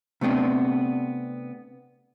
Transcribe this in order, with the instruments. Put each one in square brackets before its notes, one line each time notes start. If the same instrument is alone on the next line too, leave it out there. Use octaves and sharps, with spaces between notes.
[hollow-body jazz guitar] C3 A3 B3 C4 D4